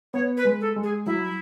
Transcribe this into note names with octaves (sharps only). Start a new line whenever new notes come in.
B3 C#5
B4
G#3
A4
G#3
G#4
F#3 E4